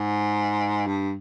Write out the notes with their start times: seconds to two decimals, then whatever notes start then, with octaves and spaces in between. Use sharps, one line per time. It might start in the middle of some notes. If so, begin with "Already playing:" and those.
Already playing: G#2
0.87 G2